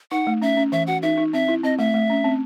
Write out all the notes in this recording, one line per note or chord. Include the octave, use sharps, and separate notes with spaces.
D#4 F#5
A3
C#4 E5
C#4
E3 E5
F#4 F#5
D#4 E5
D#4
C4 E5
E4
C4 D#5
A3 E5
A3
C#4
C4